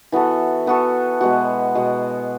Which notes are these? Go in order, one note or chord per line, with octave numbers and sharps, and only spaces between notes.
E3 B3 F#4 A4
E3 B3 F#4 A4
B2 G#3 B3 F#4
B2 G#3 B3 F#4